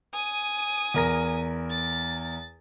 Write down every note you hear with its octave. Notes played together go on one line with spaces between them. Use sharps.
G#5 D#6
E2 A#4 A#6
A6